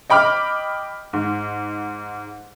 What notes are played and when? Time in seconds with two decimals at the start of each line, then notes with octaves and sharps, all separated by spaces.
0.10 D#5 G5 B5 D6 F6
1.13 G#2